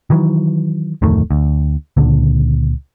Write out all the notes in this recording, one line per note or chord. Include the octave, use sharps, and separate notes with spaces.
D#3 E3 F#3
D1 F2 D#3 A3
D2
C#2 A#2 D3